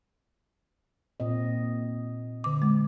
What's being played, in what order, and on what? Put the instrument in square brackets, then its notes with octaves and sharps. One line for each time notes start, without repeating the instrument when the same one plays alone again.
[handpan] A#2 C4 D#5
[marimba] D3 D6
G#3